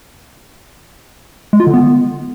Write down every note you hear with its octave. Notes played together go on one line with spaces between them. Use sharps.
G#3
F4
D3
B3